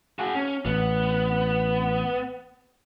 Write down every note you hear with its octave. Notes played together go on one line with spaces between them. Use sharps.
F#4 G#4
C#4
A1 B3